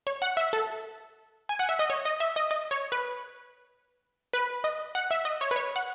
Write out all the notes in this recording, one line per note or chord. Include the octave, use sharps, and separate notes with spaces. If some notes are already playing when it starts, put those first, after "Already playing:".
C#5
F#5
E5
A4
G#5
F#5
E5
D#5
C#5
D#5
E5
D#5
D#5
C#5
B4
B4
D#5
F#5
E5
D#5
C#5
B4
C#5
F#5